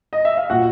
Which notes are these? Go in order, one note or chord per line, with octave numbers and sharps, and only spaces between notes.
D#5
E5
F5
A#2 F#4 F#5